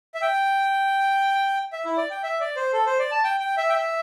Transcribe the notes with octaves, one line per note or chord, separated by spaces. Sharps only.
E5
G5
E5
E4
D5
G5
E5
D5
C5
A4
C5
D5
A5
G5
G5
E5
G5
E5